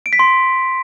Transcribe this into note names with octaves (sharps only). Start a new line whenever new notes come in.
D7
B6
C6